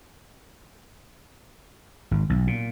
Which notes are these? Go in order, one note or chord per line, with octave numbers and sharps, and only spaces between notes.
G#1
B1
A#2